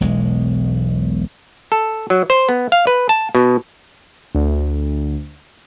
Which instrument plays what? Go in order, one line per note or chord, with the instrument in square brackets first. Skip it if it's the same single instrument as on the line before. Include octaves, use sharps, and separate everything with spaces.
[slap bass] E1 B1 G#3
[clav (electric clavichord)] A4
F#3
C5
B3
F5
B4
A5
B2
[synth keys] D2